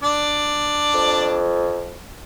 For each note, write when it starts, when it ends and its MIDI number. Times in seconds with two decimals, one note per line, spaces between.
0.03 1.42 62
0.03 1.42 74
0.94 1.98 41